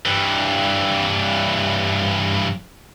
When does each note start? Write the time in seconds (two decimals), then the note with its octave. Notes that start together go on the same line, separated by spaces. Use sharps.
0.05 G2 E3